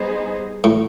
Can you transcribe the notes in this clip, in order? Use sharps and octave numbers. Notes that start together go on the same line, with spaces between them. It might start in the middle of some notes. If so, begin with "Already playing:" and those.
Already playing: G3 B3 D#4 G#4 C5
A2